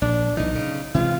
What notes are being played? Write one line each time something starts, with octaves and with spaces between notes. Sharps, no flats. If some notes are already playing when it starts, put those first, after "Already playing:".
A#1 D4
B1 E3 D#4
C#3
C3 E3 G#3 F4